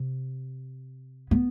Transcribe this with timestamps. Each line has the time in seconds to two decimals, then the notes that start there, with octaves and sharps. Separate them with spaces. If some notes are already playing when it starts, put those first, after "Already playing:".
Already playing: C3
1.31 B3